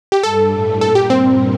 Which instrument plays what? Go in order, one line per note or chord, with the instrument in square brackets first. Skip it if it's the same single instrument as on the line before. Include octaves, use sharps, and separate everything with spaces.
[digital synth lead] G4
[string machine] G2 G3 [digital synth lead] A4
[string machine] A2 A3
[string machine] A#2 A#3 [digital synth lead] A4
[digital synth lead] G4
[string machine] G2 G3 [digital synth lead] C4